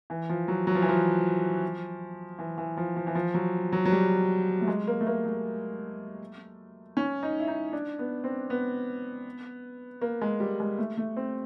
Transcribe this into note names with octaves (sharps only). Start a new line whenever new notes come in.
E3
F3
F#3
F#3
F3
E3
F3
E3
E3
F3
F3
E3
F3
F#3
F#3
F#3
G3
A3
G#3
A#3
A3
A#3
A3
C#4
D#4
E4
D#4
D4
B3
C4
B3
A#3
G#3
G3
G#3
A3
A3
C4